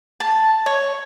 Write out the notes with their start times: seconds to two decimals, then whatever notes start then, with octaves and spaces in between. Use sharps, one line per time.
0.20 A5
0.66 C#5